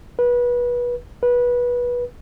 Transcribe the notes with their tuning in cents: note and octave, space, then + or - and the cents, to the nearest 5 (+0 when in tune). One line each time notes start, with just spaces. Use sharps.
B4 -25
B4 -20